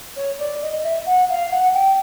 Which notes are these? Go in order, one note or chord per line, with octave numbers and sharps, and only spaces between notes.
C#5
D5
D#5
E5
F#5
F5
F#5
G5